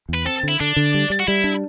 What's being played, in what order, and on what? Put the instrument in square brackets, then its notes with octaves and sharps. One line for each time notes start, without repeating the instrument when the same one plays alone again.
[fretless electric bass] E2
[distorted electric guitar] B4
[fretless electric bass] C4 [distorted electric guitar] A4
[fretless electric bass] D3
[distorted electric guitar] E4
[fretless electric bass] D3 [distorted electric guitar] D4
[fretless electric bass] D3
G3
G3
[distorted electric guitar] F#4
[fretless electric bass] G3 [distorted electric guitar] E4
[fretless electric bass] D4